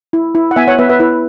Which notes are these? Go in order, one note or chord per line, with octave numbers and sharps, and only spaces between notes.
E4
E4
F#5
B3 E5 G#5
C#5 F#5
B3 B4 E5
B4 E5
E4 B4